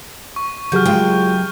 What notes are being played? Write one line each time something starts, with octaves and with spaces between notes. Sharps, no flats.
C#6
C#3 F#3 G4 G#4 F6 G6
F#2 F#3 G#3 F4 F#4 G5